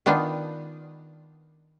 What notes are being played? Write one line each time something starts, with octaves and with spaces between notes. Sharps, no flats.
D#3 B3 D4 D#4 F4